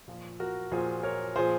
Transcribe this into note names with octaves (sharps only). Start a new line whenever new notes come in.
A#2 F3
F#4 A#4
A#2 F3 G#4 C5
A#4 C#5
A#2 F3 G#4 C5